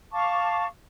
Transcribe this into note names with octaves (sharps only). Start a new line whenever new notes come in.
F5 A5 C#6 D6